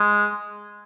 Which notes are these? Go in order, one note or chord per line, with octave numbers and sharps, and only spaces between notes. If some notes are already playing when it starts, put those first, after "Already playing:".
Already playing: G#3